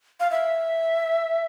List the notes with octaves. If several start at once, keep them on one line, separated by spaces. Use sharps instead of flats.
F5
E5